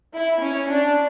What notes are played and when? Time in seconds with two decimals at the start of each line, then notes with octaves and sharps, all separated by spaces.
0.14 E4
0.41 C#4
0.70 D4